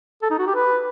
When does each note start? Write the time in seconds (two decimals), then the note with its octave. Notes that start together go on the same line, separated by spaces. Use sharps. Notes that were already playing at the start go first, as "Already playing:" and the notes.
0.22 A4
0.30 D#4
0.39 F#4
0.47 G4
0.55 B4